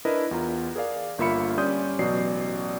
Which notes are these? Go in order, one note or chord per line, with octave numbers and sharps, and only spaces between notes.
D4 E4 A#4 B4 D#5
E2 F4 A#5
G#4 A#4 D5 F5
G1 A#3 F4 E5 B5 C#7
G3 C#4 D5 C6 D#6 G6
A1 B2 F#3 D5 C7